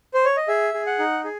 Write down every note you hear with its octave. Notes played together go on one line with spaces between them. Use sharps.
C5
C#5
D#5
G#4 E5
G#4
F#5
D#4
G#4